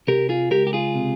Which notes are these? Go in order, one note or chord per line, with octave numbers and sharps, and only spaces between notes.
C3 G4 A#4
F4 G#4
C#2 G4 A#4
G4
F4 G#4
C3